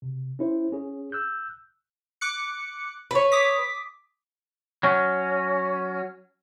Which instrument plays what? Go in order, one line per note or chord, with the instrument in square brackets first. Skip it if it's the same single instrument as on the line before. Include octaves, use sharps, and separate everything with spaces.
[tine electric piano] C3
C#4 E4 C5
C#4 G#4
E6 F#6 G6
[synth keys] D6 F#6 C#7
[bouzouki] B4 C#5
[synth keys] D6 D#6 B6
[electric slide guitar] F#3 C#4